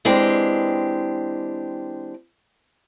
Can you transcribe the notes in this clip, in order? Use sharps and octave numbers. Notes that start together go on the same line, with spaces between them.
E3 G#3 C4 D4 G4